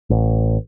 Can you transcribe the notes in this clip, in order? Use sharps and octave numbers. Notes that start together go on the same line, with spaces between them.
A1